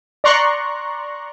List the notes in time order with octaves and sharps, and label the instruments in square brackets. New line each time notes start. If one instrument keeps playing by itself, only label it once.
[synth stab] D5 A#5 C6 C#6 F#6